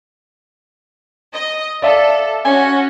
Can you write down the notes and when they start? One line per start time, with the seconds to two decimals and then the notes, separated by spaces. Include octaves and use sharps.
1.34 D#5
1.82 A4 D5 E5 F5
2.45 C#4 F#4 G#5